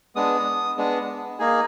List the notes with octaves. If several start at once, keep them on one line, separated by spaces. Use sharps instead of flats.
G#3 B3 D4 D#6
G#3 B3 D4
A#3 D#4 G#4